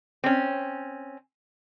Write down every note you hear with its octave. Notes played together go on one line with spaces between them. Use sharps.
C4 C#4